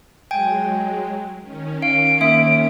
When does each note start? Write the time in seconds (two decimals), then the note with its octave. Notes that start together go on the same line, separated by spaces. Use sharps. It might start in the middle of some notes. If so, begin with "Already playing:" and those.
0.31 F#3 G#3 G5 G#5
1.40 D#3 C#4
1.82 F5 D7
2.21 A#3 E5